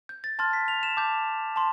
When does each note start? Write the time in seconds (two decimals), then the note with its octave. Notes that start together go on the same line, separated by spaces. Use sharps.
0.09 G6
0.24 A6
0.39 A5 C6 F6 A6
0.53 B6
0.68 F7
0.83 E7
0.97 A5 D6 G6
1.56 A5 C6